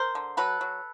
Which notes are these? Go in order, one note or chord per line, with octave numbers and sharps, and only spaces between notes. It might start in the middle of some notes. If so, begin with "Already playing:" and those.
Already playing: A#4 C5
D3
F#3 A4 B4
F#3